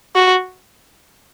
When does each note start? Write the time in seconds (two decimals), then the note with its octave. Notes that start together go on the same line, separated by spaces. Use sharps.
0.15 F#4